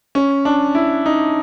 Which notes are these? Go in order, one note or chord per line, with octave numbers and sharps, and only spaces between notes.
C#4
D4
E4
D#4